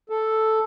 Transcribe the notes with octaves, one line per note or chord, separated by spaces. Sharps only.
A4